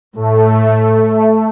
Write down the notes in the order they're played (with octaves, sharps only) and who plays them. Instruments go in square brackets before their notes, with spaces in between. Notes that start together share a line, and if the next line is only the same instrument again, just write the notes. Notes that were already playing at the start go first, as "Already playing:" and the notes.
[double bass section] A2 [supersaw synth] A3